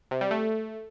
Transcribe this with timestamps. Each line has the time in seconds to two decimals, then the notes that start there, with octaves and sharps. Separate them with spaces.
0.11 C3
0.21 G3
0.31 A3